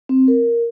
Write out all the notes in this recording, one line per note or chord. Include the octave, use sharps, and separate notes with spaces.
C4
A#4